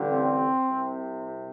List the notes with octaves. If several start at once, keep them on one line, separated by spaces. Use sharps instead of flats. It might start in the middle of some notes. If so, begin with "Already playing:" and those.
Already playing: A1 G2 D3
C4
C2 C3